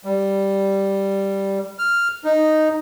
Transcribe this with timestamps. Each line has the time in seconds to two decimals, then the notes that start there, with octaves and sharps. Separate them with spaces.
0.05 G3
1.79 F6
2.24 D#4